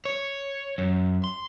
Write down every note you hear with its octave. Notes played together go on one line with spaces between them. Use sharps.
C#5
F#2
C6